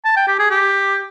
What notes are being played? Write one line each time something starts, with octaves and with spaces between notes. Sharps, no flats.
A5
G5
G4
G#4
G4